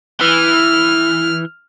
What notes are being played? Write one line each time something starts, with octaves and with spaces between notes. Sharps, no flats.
E3 F6